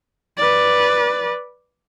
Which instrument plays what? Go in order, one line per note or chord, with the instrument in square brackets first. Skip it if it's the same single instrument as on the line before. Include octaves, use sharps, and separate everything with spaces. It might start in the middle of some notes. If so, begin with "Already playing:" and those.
[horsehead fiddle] B4 D5